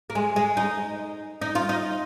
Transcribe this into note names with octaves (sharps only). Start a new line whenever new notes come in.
A#3
G#3
G#3
D#4
D#4
F4
D#4